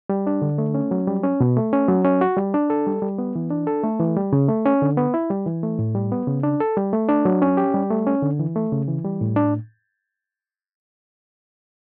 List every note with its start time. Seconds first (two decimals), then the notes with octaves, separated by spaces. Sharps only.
0.09 G3
0.27 D4
0.42 D3
0.58 A3
0.74 C#4
0.91 F#3
1.07 G3
1.23 C#4
1.41 B2
1.57 A3
1.73 C#4
1.88 F#3
2.05 C#4
2.21 F#4
2.37 G3
2.54 D4
2.70 A4
2.87 G3
3.02 G3
3.18 B3
3.36 E3
3.51 D4
3.67 A4
3.83 A3
4.00 E3
4.17 G3
4.33 C#3
4.49 A3
4.66 C#4
4.82 D3
4.97 B3
5.14 E4
5.30 G3
5.46 E3
5.63 A3
5.79 A2
5.95 G3
6.12 B3
6.27 C#3
6.43 D4
6.60 A4
6.77 G3
6.93 A3
7.09 D4
7.25 F#3
7.42 C#4
7.57 G4
7.74 G3
7.91 A3
8.07 C#4
8.22 D3
8.39 E3
8.56 A3
8.72 C#3
8.88 E3
9.05 G3
9.21 A2
9.36 D4